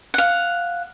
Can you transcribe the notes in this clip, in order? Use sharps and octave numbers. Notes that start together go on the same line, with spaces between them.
F5 F#5